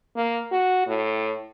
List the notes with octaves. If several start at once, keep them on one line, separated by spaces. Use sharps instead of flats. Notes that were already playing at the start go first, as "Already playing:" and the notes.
A#3
F#4
A2